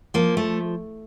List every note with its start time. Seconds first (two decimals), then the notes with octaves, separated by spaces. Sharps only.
0.14 F3 A#3
0.37 A3